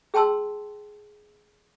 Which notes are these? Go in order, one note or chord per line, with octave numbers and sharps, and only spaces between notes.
G#4 G5 A5 C6 E6